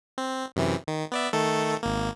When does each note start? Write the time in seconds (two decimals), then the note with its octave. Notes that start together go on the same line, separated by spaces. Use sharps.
0.18 C4
0.56 F#2 C3 E3
0.88 D#3
1.12 B3 D5 E5
1.33 D#3 A3 A4
1.83 G#1 A#3